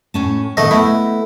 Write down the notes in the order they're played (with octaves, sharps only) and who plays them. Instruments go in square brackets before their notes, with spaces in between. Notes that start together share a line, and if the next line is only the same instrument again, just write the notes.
[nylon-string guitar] A2 C#4 A5
[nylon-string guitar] A#2 D#3 B3 [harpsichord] A3 D#5
[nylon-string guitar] A3 B3 [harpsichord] E4